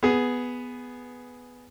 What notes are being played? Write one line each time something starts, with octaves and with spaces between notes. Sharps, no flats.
B3 G#4